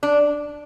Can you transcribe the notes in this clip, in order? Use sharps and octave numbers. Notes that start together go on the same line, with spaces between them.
D4